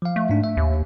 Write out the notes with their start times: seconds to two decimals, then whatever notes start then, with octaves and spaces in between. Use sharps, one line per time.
0.02 F3 F5
0.16 A3
0.29 G#2 D4
0.44 E5
0.57 D#2